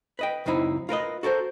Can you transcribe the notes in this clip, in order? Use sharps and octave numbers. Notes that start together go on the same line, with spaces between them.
B4 D#5 G5
C#2 F#2 C4 D#4 E4
F4 A#4 B4 D#5
F#4 A4 A#4 C5